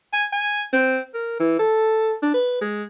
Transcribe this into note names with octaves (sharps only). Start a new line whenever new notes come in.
G#5
G#5
C4
A#4
E3
A4
D4
B4
G#3